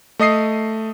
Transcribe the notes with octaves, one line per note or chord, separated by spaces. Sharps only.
A3 D#5 D#6 C7